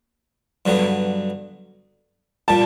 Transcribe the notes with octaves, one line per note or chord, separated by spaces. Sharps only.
G2 D3 F#3 B3
A#2 G3 A5